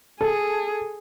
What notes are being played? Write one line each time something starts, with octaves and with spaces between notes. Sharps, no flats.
G#4 A4